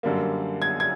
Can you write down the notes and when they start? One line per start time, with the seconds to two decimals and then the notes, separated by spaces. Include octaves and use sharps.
0.03 F#2 D3 G3 A#3
0.62 G#6
0.80 G#6